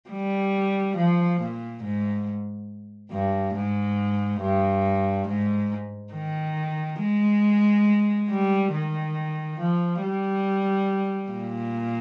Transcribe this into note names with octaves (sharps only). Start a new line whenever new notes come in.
G3
F3
A#2
G#2
G2
G#2
G2
G#2
D#3
G#3
G3
D#3
F3
G3
A#2